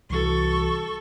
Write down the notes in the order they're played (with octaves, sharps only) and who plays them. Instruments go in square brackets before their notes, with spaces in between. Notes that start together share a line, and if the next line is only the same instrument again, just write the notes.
[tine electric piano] C2 E3 F#4 [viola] A4 C#6